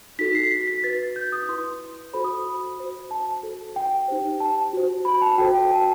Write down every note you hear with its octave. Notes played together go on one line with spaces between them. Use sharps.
D#4 F#4 A4 B6
C7
B6
B6
F#4 B4 A6
G6
D#6
E4 B4 C6
F#4 A4 C5 B5
D#6
B5
F#4 C5
A5
F#4 A4 C5
G5
D#4 G4 C5
A5
F#4 C5
B5
A5
F#4 A4 C5 G5
G5
A5